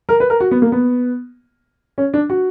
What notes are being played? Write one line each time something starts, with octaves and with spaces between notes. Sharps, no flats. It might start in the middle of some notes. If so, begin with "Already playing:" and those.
A#4
B4
A#4
F#4
B3
A#3
B3
C#4
D4
F#4